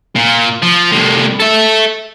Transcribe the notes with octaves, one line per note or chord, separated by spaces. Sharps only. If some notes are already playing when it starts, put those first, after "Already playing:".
A#2
F3
C2 A2
A4 E5